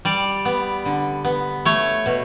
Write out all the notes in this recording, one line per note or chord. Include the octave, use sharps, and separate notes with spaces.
G3 D5
B3
D3
B3
A3 C#5
B2